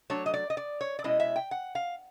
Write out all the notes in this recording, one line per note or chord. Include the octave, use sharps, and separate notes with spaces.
F#3 A3 D4 C#5
D#5
D5
D#5
D5
C#5
D5
B2 G#3 C#4 E4 D#5
E5
G5
F#5
F5